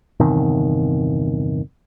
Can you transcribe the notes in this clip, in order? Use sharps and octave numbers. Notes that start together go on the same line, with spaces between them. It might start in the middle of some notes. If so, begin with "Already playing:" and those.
G1 E2 C3 D#3